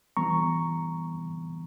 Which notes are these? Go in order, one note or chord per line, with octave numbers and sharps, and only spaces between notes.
E3 G3 B3 A#5 C#6